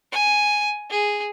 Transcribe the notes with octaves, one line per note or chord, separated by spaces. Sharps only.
G#5
G#4